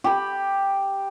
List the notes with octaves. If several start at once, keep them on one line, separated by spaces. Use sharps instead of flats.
G4 B5